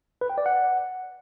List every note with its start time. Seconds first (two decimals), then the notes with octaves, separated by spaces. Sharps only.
0.21 B4
0.30 G5
0.38 D5
0.46 F#5